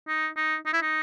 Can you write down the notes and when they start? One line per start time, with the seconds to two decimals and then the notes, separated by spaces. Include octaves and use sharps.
0.08 D#4
0.36 D#4
0.66 D#4
0.73 E4
0.82 D#4